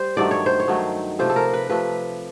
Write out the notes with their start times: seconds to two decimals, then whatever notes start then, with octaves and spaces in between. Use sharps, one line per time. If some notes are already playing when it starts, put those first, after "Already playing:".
Already playing: G3 C5
0.17 G2 D#3 F#3 A3 D5
0.31 C#5
0.46 C5
0.60 C#5
0.68 G2 D#3 F#3 A3
1.19 C3 F3 A3 C5
1.30 A4
1.36 A#4
1.53 B4
1.70 C3 F3 A3 B4